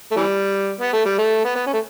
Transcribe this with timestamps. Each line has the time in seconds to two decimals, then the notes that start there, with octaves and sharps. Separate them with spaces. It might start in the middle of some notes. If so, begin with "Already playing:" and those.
0.11 A3
0.16 E3 G3
0.80 B3
0.93 A3
1.05 G3
1.18 A3
1.45 B3
1.55 B3
1.66 C#4
1.74 A3